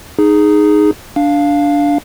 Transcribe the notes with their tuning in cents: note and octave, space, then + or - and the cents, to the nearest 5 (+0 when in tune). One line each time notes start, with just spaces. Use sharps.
D#4 -10 G#4 +0
D4 -10 F5 +0